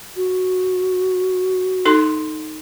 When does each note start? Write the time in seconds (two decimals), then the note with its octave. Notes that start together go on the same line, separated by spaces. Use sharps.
0.16 F#4
1.85 D#4 A4 C6